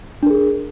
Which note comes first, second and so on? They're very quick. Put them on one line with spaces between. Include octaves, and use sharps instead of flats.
D4 A#4 G#4